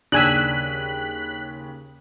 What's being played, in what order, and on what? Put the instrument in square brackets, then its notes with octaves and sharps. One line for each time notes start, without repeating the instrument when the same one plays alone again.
[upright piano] D#2 C#3 G5 [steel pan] D4 G#5 E6 [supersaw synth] F#6 B6